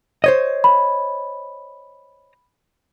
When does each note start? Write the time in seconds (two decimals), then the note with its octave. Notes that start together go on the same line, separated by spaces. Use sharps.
0.24 C5 C#5 D#5
0.64 B5